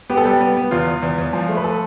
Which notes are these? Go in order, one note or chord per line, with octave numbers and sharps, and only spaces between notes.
B3 G4
A4
G3 G4
B3
B3
E2 F4
E2
E2
E2
F3
A3
B4
F3 A4